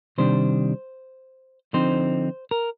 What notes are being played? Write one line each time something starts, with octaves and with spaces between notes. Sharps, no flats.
C3 D#3 G3 D4 C5
D3 F3 C4 D#4 C5
A#4